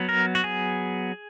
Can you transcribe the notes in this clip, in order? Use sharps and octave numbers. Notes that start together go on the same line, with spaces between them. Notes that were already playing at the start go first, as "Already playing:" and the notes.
Already playing: F#3 B3
A#4
F#4
G#4